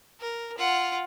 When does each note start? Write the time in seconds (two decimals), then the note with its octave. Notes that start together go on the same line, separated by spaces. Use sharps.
0.20 A#4
0.58 F4 F#5